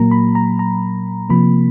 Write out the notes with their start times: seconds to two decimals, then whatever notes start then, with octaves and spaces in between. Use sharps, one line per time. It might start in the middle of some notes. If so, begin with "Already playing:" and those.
Already playing: A#2 F#3 A#3 A#5
0.11 B5
0.35 A#5
0.59 A#5
1.29 C3 F3 A#3 B5